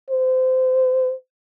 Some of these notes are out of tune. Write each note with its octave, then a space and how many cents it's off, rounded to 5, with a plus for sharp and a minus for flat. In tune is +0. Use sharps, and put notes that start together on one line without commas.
C5 -25